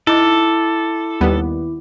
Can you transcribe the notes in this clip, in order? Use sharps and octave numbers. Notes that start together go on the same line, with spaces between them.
D#4 E4 A4 D6
D#2 G3 B3